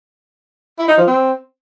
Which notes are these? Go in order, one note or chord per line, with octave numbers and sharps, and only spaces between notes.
E4
D#4
F3
C4